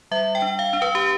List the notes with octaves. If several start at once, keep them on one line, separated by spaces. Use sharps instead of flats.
G3 E5
G5
D4
F5
D4
B4
G4